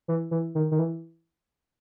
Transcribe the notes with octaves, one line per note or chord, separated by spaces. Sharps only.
E3
E3
D#3
D#3
E3